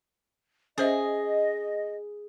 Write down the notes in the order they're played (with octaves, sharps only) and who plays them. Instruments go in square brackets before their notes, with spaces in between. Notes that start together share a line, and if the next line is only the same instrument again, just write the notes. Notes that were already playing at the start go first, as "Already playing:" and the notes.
[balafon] C#4 C5 E5 [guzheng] G#4 [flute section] D#5